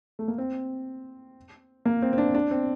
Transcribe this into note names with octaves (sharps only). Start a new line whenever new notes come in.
A3
A#3
C4
A#3
C4
C4
D4
D4
C4